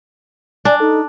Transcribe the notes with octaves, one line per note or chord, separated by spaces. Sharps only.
D4 D5 G#5
D#4 A4